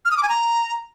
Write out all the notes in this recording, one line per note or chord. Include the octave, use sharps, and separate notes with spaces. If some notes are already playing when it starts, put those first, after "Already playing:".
F6
D#6
D6
G#5
A#5